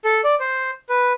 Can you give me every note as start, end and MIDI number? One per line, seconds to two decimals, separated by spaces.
0.05 0.21 69
0.24 0.35 74
0.40 0.71 72
0.89 1.13 71